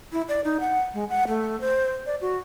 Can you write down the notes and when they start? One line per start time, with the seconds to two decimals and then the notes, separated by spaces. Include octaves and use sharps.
0.12 E4
0.28 D5
0.44 D#4
0.60 F#5
0.94 G#3
1.10 F#5
1.28 A3
1.61 C5
2.06 D5
2.21 F#4